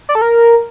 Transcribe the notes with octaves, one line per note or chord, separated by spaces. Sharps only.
D5
A4
A#4